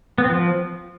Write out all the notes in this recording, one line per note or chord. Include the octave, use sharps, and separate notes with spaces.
B3
C4
F3